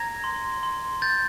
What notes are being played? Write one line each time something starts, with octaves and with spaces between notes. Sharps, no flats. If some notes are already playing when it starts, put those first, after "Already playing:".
Already playing: A#5 G#6 A#6
C6
C6
G6 A6